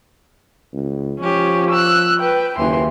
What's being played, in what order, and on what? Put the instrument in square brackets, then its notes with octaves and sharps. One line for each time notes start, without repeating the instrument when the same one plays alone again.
[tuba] C#2
[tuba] F3 [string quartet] C#4 G4
[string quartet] E6 F#6
B4 G5
[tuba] F#1 [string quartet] D#2 E3 C6